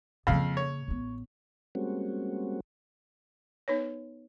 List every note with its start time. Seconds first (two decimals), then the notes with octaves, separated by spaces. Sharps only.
0.27 F2 C#3 A#3 F5
0.57 C#5
0.88 A1 B3
1.75 G3 G#3 A#3 C4 C#4 F#4
3.68 B3 D#4 B4 C#5